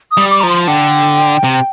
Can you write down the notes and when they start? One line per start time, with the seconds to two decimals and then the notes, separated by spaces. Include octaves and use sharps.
0.11 D#6
0.17 G3
0.31 D6
0.41 F3 A#5
0.49 C6
0.68 D3 G5
1.44 C3